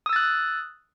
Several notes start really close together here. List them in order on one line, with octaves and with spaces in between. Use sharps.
D#6 E6 A6 F#6